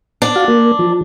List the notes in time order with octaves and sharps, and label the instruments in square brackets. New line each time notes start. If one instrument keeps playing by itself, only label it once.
[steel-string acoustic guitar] D4
[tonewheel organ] F#4 F5
A#3
F3